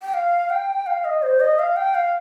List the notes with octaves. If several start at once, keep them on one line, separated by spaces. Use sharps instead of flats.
G5
F5
G5
F5
D#5
C5
D#5
F5
G5
F5